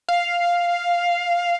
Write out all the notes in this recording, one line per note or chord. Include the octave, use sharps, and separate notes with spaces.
F5